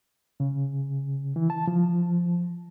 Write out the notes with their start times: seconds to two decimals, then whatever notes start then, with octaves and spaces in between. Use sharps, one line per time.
0.40 C#3
1.36 E3
1.50 A5
1.67 F3